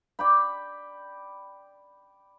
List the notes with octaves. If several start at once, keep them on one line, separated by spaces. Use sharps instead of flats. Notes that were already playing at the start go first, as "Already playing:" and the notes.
D5 G5 B5